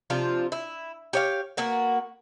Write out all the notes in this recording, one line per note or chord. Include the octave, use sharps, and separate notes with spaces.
C3 F3 D4 F4
E4
G4 C#5 F5
A#3 B3 F#4 A#4